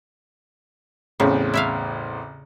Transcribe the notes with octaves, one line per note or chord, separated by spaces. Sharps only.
A1 E2 C#3 C4
E4 E5 F5